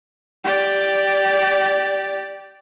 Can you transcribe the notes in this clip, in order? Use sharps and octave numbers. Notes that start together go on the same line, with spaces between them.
G4 D5